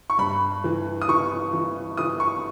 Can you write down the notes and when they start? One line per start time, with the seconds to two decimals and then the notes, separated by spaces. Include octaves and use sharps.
0.10 C#6
0.18 G2 B5
0.64 E3
1.02 D#6
1.08 E3 C#6
1.53 E3
1.97 E3 D#6
2.20 C#6